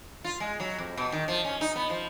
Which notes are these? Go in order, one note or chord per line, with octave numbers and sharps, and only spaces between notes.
F4
G#3
F#3
F2
B2
D#3
F3
C#4
D#4
B3
F3